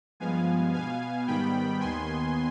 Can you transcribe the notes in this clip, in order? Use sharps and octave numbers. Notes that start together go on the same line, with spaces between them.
G2 F3 G#3 B3 F5 G#5
B2 B3 F5 G#5
G#2 D#3 G3 B3 G5 B5
D#2 D#3 B3 G#5 C6